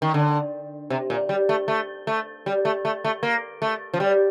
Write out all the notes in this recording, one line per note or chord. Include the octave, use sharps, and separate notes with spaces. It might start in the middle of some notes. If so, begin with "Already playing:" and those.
D#3
D3
C3
A#2
G3
A3
A3
A3
G3
A3
A3
A3
A#3
A3
F3
G3